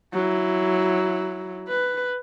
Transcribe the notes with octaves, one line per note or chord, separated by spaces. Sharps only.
F#3 E4
B4